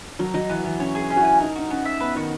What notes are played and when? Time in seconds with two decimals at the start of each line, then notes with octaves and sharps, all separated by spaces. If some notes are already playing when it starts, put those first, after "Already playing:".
0.19 F#3 A#4
0.34 F#3 D#4
0.49 E3 B3
0.64 E3 B3
0.80 C#4 C#5
0.95 G#4
1.10 C#4
1.16 F#4
1.21 E4 G#5
1.40 D#4 A#4
1.55 D#4 F#4
1.70 B3 C#4
1.85 E5
2.00 B3 B4
2.16 D#3 F#4